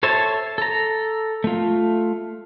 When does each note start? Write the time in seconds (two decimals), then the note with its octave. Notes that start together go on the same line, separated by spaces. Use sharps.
0.03 A4 C5 C#5 E5 A5
0.58 A4 A#5
1.44 A3 F4